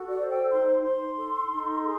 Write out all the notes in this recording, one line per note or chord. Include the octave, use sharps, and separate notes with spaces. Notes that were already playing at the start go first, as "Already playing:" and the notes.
Already playing: F#4 A4
D5
C5
G5
D#4 C6
D#4 C6
A4
D#4
G#4